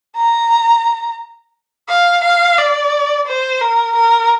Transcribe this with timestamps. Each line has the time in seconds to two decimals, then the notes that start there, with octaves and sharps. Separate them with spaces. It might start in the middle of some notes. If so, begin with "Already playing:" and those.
0.16 A#5
1.89 F5
2.24 F5
2.58 D5
3.28 C5
3.61 A#4
3.96 A#4